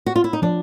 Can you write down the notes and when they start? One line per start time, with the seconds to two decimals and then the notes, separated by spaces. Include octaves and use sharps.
0.06 F#4
0.16 F4
0.24 E4
0.33 D#4
0.42 F3 D4